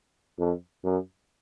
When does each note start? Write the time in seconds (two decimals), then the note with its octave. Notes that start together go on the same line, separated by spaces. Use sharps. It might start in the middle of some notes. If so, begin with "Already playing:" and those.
0.39 F2
0.84 F#2